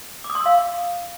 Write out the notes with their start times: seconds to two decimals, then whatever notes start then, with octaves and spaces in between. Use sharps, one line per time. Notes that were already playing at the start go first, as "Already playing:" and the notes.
0.24 D6
0.30 D#6
0.35 C6
0.40 E6
0.46 F5